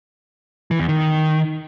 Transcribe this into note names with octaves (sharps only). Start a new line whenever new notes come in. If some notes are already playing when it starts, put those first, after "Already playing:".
E3
E2
D#3